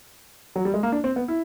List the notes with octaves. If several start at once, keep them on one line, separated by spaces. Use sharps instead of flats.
F#3
G3
G#3
A#3
D4
C4
B3
E4